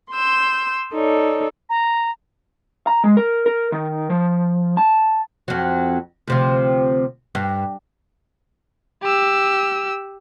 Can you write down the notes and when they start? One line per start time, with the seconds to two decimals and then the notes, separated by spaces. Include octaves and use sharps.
0.12 C6 E6 G6
0.93 D#4 A4 C#5 D5
1.70 A#5
2.87 A#5
3.04 G#3
3.17 A#4
3.46 A#4
3.72 D#3
4.10 F3
4.77 A5
5.48 F2 F#3
6.27 D2 C3 F3
7.35 G2
9.03 G4 E6